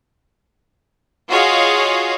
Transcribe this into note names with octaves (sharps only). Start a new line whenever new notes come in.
F4 F#4 G#4 C#5 D#5 F5